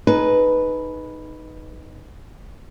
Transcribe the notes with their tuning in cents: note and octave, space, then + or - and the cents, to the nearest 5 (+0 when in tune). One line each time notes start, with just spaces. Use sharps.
D#4 +0 G#4 +40 B4 +0